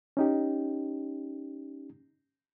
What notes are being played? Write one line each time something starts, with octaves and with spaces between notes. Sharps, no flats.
C#4 D#4 G4